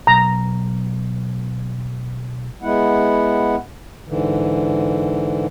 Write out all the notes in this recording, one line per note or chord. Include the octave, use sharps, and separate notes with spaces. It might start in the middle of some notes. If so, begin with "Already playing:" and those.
B1 A#5
G#3 B3 E4 F#5
G#2 D3 E3